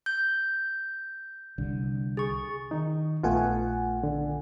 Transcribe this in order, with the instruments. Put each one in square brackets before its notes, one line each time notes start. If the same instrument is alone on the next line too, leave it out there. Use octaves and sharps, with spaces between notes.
[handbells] G6
[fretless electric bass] C2 D3
[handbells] G#4 C#6
[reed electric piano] D#3 D#4
[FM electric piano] A#1 F#5 G#5 [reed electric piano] A3 B3 F4
[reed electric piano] D3